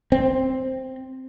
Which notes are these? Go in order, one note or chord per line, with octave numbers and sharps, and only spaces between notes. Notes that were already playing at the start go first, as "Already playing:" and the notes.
C4